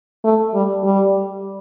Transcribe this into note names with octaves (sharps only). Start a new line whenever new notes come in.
A3
G3
G3